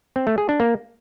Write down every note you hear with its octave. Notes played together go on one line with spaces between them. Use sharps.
C4
A3
G#4
D4
A#3